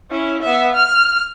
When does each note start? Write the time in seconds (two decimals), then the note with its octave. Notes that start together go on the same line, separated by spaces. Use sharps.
0.11 C#4 E4
0.42 B3 E5
0.75 F6